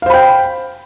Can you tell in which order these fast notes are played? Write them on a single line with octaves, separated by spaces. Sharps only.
F5 C5 B5 G5